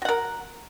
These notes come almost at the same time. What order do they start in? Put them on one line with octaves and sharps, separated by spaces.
F#4 F#5 A#4